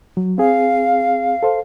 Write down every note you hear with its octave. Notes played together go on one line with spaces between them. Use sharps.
F#3
C4 G#4 F5
A4 C5